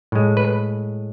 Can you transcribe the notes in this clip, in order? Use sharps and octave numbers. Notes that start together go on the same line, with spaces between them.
A2 G#3
B4